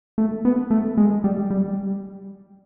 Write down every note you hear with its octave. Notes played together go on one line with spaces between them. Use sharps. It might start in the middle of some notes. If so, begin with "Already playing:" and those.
A3
B3
A3
G#3
G3
G3